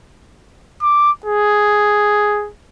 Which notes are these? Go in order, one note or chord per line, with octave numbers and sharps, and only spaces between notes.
D6
G#4